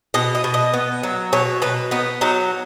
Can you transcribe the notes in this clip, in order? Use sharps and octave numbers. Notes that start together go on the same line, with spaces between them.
B2 D#5
D#5
B2
D#5
B3
F#3
B2 C#5
B2 B4
B3 D#4
F#3 D#4